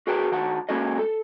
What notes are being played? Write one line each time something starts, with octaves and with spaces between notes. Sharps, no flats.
F#4 G#4 A#4 B4 G5
D#3 F#4 F#5 A5
G#3 A#3 C#4 F#4 A4 D#5
A4